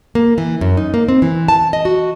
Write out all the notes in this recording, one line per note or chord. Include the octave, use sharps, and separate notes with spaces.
A#3
E3
F#2
D#4
A#3
C4
E3
A5
D#5
F#4